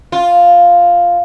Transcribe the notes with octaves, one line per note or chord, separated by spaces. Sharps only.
F4